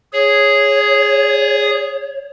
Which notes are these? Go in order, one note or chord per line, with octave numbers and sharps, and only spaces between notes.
G#4 C#5